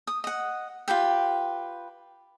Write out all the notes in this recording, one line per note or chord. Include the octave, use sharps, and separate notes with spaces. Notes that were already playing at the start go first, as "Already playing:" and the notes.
D#6
D#5 F#5
F4 G4 B4 G5